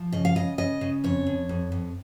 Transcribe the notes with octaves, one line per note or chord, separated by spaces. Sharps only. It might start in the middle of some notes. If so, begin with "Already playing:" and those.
Already playing: F3
C#3 D#5
F5
C#3 D#5
C#3 D#5
C#3
F2 C#5
F2
F2
F2